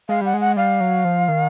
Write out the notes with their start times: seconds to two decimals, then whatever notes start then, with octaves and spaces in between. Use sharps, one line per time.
0.09 G#3 F5
0.21 G3 F#5
0.34 G#3
0.41 F#5
0.57 G3 F5
0.80 F#3
1.05 F3
1.28 D#3